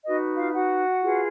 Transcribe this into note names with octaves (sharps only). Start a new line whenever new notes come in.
D#4 F#4 B4 D#5
F4 F5
F#4 F#5
F4 G#4 B4